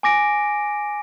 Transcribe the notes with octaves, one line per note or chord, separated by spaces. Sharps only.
G#5 D6 A#6 D7